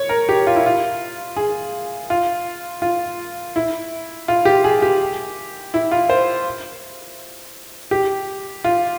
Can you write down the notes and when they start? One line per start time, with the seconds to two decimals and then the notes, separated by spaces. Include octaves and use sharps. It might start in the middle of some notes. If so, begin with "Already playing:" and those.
Already playing: C#5
0.09 A#4
0.29 G4
0.47 F4
0.56 E4
0.66 F4
1.37 G#4
2.10 F4
2.82 F4
3.56 E4
4.28 F4
4.45 G4
4.64 G#4
4.82 G4
5.74 E4
5.92 F4
6.10 C5
7.91 G4
8.64 F4